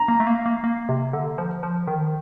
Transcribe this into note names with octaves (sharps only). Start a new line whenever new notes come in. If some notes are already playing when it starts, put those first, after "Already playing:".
Already playing: A#5
A#3
A3
A#3
A#3
A#3
C3
D3
F3
F3
D#3